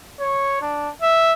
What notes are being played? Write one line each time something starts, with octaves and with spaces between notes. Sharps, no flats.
C#5
D4
E5